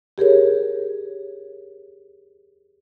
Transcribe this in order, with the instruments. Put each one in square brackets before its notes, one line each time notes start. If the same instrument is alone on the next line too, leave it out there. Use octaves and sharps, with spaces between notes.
[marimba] G4 G#4 A#4 C#5